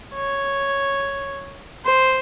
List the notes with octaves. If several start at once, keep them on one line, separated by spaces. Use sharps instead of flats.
C#5
C5